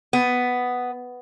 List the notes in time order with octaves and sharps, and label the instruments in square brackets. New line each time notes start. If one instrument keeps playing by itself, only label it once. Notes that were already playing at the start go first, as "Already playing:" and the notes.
[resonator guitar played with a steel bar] B3